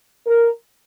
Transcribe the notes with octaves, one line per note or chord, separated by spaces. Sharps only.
A#4